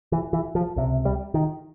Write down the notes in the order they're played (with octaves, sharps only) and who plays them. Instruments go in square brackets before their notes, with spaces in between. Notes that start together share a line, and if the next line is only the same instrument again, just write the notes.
[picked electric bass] E3
E3
F3
C#2 C3
G3
D#3